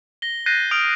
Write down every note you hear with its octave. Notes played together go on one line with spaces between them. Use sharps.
A#6 G7
F#6 G6 A6 A#6 C7 D#7
D#6 F6 D7 F7 G7